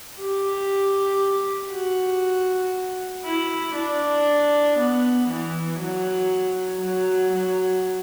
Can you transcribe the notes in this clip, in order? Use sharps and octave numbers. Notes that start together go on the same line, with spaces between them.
G4
F#4
E4
D4
B3
E3
F#3
F#3
F#3